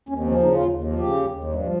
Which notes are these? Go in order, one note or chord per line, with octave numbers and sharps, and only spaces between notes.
D#2 C#4
C4
F3
C#4
C#3 D#4
D#2 F4
D#2
F3
C#3 G4
D#2
D#2
G2
F3